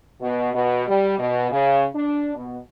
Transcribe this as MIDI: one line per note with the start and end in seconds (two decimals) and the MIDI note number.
0.20 0.49 47
0.53 0.84 47
0.88 1.16 55
1.18 1.50 47
1.51 1.85 49
1.95 2.32 62
2.35 2.58 47